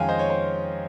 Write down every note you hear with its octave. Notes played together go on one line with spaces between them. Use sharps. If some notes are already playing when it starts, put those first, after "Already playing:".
Already playing: F2 D#3 G#3 C#4 F5 G5 G#5 A#5
C5 D#5
C#5
C5